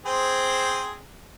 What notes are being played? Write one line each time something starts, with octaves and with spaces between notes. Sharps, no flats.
C4 G#4 C5